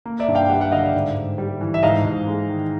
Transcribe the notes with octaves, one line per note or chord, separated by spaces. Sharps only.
A#3
D5 E5
G2
F5 G5
G3 E5 F#5
E5 F#5
D3 D#5 F5
D5 E5
G#2
G#2
G3
E3
E5
G#2 D#5 F5
G#2
G#3
D#3